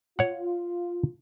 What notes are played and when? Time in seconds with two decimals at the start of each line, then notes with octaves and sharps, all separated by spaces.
0.19 F4 C#5 F#5